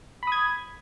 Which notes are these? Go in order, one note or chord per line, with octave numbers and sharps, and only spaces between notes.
B5 D#6 G#6